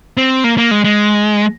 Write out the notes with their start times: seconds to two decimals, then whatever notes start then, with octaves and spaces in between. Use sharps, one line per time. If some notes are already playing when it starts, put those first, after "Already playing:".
0.17 C4
0.44 A#3
0.58 A#3
0.71 G#3
0.84 G#3